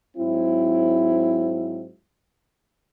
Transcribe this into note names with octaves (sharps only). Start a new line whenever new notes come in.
G#2 F#3 C4 E4